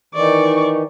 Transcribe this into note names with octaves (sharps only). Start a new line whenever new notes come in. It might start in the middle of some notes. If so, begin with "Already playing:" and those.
D#3 E3 D#4 D5 C#6